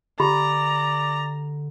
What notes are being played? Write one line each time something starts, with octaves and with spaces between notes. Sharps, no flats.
D3 G4 D5 A#5 B5